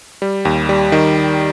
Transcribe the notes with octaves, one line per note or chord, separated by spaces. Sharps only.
G3
D#2
G3
D#3